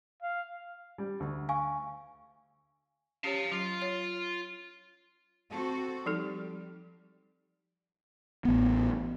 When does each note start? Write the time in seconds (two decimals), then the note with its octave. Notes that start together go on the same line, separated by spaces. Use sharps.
0.22 F5
0.98 G3
1.20 D2
1.49 F5 G#5 C#6
3.24 C#4 G4 C#5 F5 A5
3.52 F#3 F4
3.82 C#5
5.50 C4 F#4 A4
6.06 F3 G3 D#4 A4
8.45 A1 B3